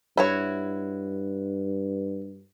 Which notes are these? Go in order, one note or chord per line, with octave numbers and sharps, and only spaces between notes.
G2 E4 F#4 C#5